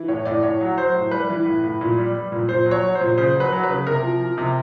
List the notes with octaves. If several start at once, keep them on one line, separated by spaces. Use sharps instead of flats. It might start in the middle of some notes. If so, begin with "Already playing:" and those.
Already playing: E3
A2 C#5
A2 D5
A2 C#5
F#3
F#3 C5
A2
G3 B4
E3
A2
A2
A#2
G3
G3
A#2
A#2 C5
F#3
C#5
F#3
C5
A#2
C#3 C5
F#3 B4
F#3
B4
C#3
C3 A#4
F3
F3
C3